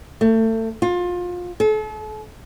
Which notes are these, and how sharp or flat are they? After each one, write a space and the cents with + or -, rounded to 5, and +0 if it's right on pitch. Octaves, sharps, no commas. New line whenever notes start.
A3 +30
F4 +25
A4 -40